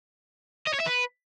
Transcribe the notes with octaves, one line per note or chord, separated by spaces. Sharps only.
D#5
C#5
E5
B4